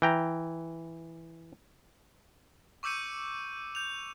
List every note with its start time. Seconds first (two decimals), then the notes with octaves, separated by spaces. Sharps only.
0.02 E3 G5 A#5
2.83 C#6 D6 E6 G6 C#7 D#7
3.75 G6 F7